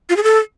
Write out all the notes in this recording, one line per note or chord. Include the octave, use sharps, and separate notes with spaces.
F4
G#4
A4